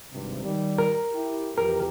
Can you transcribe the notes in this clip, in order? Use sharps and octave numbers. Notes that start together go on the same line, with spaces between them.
G#1 G2 C3
D#3 G3
A#4
E4 G4
F2 E3 G4 A#4